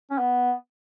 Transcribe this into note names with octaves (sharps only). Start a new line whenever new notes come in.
C#4
B3